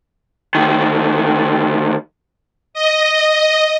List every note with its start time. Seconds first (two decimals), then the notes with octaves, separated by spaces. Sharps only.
0.55 D2 D#3
2.74 D#5